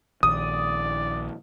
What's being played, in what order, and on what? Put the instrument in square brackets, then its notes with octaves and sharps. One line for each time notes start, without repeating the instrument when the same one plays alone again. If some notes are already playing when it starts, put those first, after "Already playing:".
[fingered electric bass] A#1 D#3 [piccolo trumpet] D5 [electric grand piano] D#6